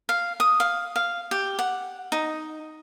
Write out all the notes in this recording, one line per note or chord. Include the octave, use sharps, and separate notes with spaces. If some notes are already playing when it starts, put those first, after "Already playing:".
F5
D#6
F5
F5
G4
F#5
D#4